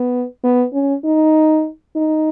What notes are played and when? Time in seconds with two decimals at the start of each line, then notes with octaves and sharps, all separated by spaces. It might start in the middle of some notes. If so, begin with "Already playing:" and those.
Already playing: B3
0.44 B3
0.73 C#4
1.05 D#4
1.96 D#4